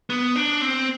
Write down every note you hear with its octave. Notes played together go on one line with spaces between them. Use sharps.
B3
D4
C4